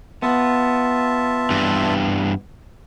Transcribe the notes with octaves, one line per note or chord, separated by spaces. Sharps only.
B3 F4 E5 A5
G2 E3